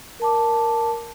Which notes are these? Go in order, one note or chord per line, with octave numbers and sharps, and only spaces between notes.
A#4 A5 D6